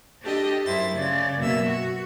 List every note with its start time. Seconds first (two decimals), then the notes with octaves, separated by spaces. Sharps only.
0.22 D4 G4 A4 D#5
0.66 F#2 E4 C5 A6
0.96 C#3 D5
1.38 F#2 B2 A#3 E5 E6
1.67 F#4